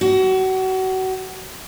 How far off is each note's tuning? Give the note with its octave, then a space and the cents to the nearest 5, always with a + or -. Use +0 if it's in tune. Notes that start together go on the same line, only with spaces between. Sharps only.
F#4 +30